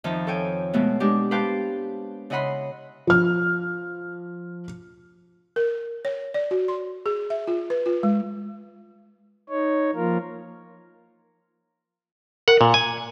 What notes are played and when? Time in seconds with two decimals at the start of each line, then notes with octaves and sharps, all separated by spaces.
0.04 F2 D#3 F3 E5 A5
0.27 A4 C#5 G5 G#5
0.73 B2 G#3 A3 B3
1.00 G#3 D4 G4
1.31 B4 C5 F5 G5 A5
2.30 C#3 E4 D#5 F#5 B5 C6
3.07 F3 F6
5.56 A#4
6.05 C#5
6.34 D5
6.51 F#4
6.68 C6
7.06 G#4
7.30 E5
7.47 F4
7.70 B4
7.86 F4
8.03 G#3
9.49 D#4 C#5
9.95 F3 A#3 F4 A#4
12.48 A#4 F#5
12.61 A#2
12.74 G#5